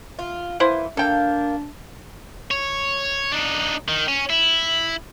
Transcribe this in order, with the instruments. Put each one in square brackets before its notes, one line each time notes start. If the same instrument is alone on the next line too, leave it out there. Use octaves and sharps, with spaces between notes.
[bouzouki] F4
[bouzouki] E3 [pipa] A#3 E4 C5
[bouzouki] A#3 F5 [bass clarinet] D4 [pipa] A4 G5
[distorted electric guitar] C#5
D4 D#4
D#3
C#4
E4